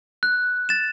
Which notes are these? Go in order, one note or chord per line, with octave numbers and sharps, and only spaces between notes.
F#6
A6 E7